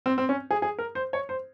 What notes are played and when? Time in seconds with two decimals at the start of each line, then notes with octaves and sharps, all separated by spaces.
0.06 C4
0.18 C4
0.29 C#4
0.51 G#4
0.62 G#4
0.79 A#4
0.95 C5
1.13 C#5
1.29 C5